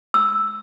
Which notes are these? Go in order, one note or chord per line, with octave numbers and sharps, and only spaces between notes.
E6